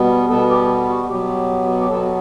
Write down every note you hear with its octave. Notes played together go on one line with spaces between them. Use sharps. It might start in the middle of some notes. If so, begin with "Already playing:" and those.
Already playing: B2 G3 B3
B2 G3 B3 A4
G4
F#4
B2 F#3 B3 G4
G4
B2 F#3 B3 A4